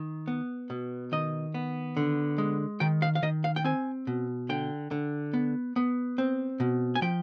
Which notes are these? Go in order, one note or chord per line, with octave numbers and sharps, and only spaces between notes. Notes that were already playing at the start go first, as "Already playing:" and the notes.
Already playing: D#3
B3
B2
D#3 D#5
B3
D3
G#3
D#3 G5
F5
F5
D#3 D#5
F5
G5
C4 G#5
B2
D3 G5
D3
B3
B3
C4
B2
G#5
F3 G5